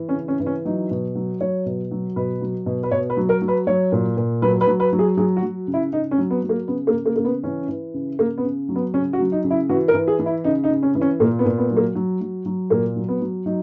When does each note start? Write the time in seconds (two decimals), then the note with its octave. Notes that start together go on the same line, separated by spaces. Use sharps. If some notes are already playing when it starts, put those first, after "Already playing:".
Already playing: E3
0.09 C#4
0.15 C#3
0.28 C#4
0.40 E3
0.46 C#4
0.65 F#3 D#4
0.91 B2
1.15 F#3
1.41 F#3 C#5
1.66 B2
1.91 F#3
2.16 B2 B4
2.41 F#3
2.66 B2
2.83 B4
2.91 B2 C#5
3.10 B4
3.17 F#3
3.29 A#4
3.42 F#3
3.48 B4
3.67 F#3 C#5
3.92 A#2
4.17 A#2
4.42 F#3 B4
4.61 B4
4.67 F#3
4.80 B4
4.93 F#3
4.99 G#4
5.17 F#3 G#4
5.37 F#4
5.43 F#3
5.67 C#3
5.74 E4
5.93 C#3 D#4
6.11 C#4
6.18 F#3
6.30 B3
6.43 F#3
6.49 A#3
6.68 C#3 B3
6.87 A#3
6.93 C#3
7.06 A#3
7.16 C#3 A#3
7.25 B3
7.44 E3 C#4
7.69 E3
7.94 C#3
8.19 C#3 A#3
8.38 B3
8.44 C#3
8.69 F#3
8.76 B3
8.94 C#3 C#4
9.13 F#4
9.20 F#3
9.32 D#4
9.44 C#3
9.51 E4
9.69 E3 F#4
9.88 A#4
9.94 E3
10.08 G#4
10.19 E3
10.26 E4
10.44 C#3 D#4
10.64 D#4
10.70 C#3
10.83 C#4
10.95 E3
11.01 C#4
11.20 A#2 A#3
11.39 B3
11.45 A#2
11.58 B3
11.70 F#3
11.77 A#3
11.95 F#3
12.21 F#3
12.46 F#3
12.70 A#2 A#3
12.96 F#3
13.08 B3
13.21 F#3
13.46 F#3 D#4